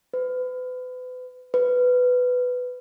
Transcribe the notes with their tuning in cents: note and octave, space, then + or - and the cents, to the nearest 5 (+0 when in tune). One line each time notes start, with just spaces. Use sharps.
B4 +35
B4 +10